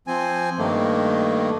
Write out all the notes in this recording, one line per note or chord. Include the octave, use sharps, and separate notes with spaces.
F3 C4 G#5
G2 D#3 A3 A#3